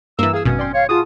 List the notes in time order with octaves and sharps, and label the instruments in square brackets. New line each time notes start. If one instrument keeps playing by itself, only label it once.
[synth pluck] G2 [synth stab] E3 A#3 [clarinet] E6
[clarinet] G#4 [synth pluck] F5 E6
[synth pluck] G#1 F#2 D#6 [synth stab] B2 [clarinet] C#4
[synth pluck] D5 G5 C6
[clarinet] C#5 [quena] F5
[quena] F4 [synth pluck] F#4 G#4 A5 [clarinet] D#6